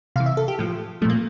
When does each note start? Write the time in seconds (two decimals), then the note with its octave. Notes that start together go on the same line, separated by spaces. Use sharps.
0.16 C3 F5
0.20 E3
0.26 E5
0.37 A4
0.48 G4
0.59 A2 F3
1.02 F3 A3
1.05 A#2 A#3